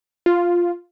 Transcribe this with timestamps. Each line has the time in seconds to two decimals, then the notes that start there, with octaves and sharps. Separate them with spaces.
0.26 F4